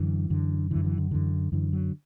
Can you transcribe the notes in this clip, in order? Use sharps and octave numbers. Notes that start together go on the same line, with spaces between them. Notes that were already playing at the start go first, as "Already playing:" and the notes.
Already playing: F#2 D3 E3
F#2 D3
F#2 D3 E3
E3
D3
F#2 D3 E3
F#2 D3 E3
F#3